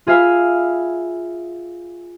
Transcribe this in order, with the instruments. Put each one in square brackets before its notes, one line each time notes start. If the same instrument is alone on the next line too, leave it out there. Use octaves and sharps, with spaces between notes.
[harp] F4 G#4 E5 F5 G#5 B5